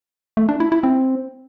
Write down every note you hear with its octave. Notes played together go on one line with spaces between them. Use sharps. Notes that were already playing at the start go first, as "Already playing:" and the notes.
A3
D4
E4
E4
C4